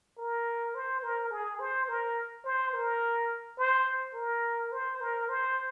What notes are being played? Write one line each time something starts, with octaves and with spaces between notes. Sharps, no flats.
A#4
C5
A#4
G#4
C5
A#4
C5
A#4
C5
A#4
C5
A#4
C5